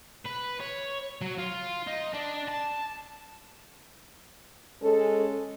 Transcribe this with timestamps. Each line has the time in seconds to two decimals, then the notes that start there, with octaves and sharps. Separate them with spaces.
0.25 B4
0.60 C#5
1.22 F#3
1.38 F4
1.87 D#4
2.14 D4
2.48 A5
4.81 G#3 C#4 A4